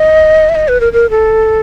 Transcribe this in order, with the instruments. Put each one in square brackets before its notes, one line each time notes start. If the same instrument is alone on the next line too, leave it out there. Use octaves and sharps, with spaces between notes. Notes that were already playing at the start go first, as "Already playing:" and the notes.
Already playing: [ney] D#5
E5
D#5
B4
A#4
A#4
A4